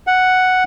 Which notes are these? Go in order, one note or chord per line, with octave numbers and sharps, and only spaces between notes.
F#5